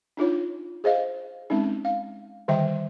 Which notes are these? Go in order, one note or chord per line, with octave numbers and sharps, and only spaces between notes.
D4 D#4 F4 C#5
G#4 C5 D#5 F5
G#3 C4 C#4 D#4
F5
D3 D#3 G3 E5 G5